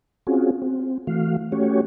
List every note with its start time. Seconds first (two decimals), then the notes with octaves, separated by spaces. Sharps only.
0.27 C4 C#4 F4 F#4 G#4
0.62 C4
1.07 E3 A3 F#4 F5
1.52 A3 C#4 F#4 G4 C#5